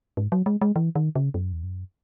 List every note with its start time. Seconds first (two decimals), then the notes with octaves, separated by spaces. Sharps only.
0.17 G#2
0.32 F#3
0.46 G#3
0.61 G#3
0.76 E3
0.95 D#3
1.16 C#3
1.34 F#2
1.53 E2
1.63 F#2